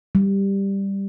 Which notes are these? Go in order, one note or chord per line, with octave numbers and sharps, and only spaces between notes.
G3